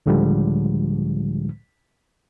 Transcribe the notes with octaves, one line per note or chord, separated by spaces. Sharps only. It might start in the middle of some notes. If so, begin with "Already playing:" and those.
C#2 A2 D3 F3 G3 G#3